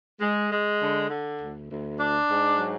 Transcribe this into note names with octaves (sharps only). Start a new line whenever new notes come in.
G#3
G#3
D3
D3
D2
D2
D4
G#2
F#3